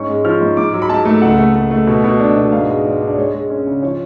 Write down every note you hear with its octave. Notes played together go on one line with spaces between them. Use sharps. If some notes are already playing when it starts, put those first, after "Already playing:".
Already playing: G#2 C#4 C#6
G#3
F3 F6
G#2
G#2 D6
F#3
B5
G#2 A5
A3
C#2 F#5
A3
A3
A3
B2
B2
D4
B2
G#2 F5
G#3
G#2 D5
D4
D5
G#3 C#5
G#3
C#4
C#3
F3 C#5